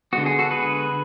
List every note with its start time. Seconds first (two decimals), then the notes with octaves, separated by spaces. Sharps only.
0.13 D3 G#3 B3 F#4
0.26 G#4
0.39 F#4 A4
0.51 G#4 B4